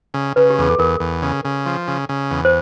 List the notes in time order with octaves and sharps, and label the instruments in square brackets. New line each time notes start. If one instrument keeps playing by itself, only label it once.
[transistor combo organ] C#3
[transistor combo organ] C#3 [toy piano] B4
[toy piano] G4
[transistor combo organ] E2 [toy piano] G#4
[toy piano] A4
[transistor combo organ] E2 [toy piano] A#4
[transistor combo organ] E2
C#3
C#3
F3
C#3
C#3
E2
[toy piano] C5